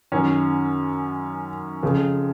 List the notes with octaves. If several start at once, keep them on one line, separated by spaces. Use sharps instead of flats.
F#2 D#3 C#4
F2 C#3 F3